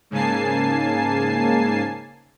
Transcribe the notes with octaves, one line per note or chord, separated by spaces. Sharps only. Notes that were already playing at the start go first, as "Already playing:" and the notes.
G#2 C#3 A#3 G#5 A5 C7